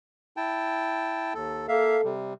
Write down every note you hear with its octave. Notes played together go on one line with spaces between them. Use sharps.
E4 G5 A5
D#2 A4
A#3 A4 E5 F5
C3 G3